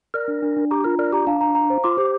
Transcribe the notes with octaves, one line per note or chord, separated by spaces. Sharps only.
A#4 D5
D4
D4
D4
G4 A#5
F4 A#4
A#4 D5
G4 A#5
D4 F5
A#5
A#5
C5
F4 D6
G4 C5